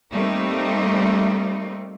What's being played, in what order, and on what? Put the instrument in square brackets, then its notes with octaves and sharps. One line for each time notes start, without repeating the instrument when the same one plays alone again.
[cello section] G3 A3 A#3 C4 D#4